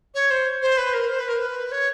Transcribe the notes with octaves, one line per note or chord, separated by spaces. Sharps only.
C#5
C5
C5
B4
A#4
C5
B4
A#4
B4
C#5